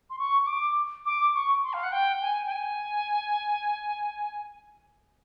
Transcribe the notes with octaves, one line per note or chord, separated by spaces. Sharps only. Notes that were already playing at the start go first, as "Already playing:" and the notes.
C6
C#6
C#6
D6
D6
C#6
C6
F5
F#5
G5
G#5
G5
G#5